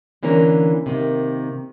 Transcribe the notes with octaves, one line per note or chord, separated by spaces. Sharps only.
D3 E3 A#3 C#4 A#4
C3 D#3 A#3